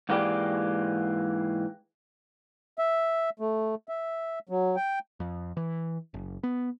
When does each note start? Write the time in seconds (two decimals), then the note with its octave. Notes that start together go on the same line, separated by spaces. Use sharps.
0.09 G#2 E3 A#3 G4 G#4 D5
2.79 E5
3.40 A3
3.89 E5
4.49 F#3
4.76 G5
5.20 F2
5.57 E3
6.14 F#1
6.43 B3